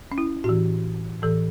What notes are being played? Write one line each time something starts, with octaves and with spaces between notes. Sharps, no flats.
C#4
E4
A2 E3 F#4
A2 E3 A4